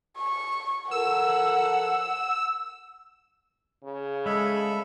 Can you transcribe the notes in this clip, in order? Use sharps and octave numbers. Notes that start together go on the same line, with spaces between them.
C#6
F3 A4 A#4 F#5 E6
C#3
G#3 A4 E5 B5